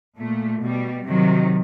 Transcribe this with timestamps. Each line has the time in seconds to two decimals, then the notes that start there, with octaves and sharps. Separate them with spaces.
0.19 A#2 A3
0.63 B2 G3
1.07 C3 D#3 F#3